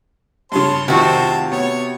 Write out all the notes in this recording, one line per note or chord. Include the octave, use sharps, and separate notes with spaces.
G2 C#3 C#5 A5 C6
F1 C3 D#3 F4 F#4 C5 A5
B3 C#5